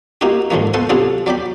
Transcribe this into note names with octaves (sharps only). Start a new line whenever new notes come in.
A#3 D#4 E4 F#4 G4
G#2 D3 D#3 F3 A#3
B3 A4 C5 F#5 C#6
C3 F#3 D4 F4 G#4 A4
F#3 D5 G5 B5